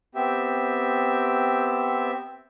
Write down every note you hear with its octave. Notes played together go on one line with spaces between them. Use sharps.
B3 C4 G4 E5